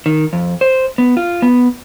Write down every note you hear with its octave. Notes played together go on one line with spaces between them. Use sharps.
D#3
F2
C5
B3
F4
B3